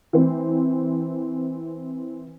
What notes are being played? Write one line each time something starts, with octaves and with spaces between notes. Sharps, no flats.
E3 C4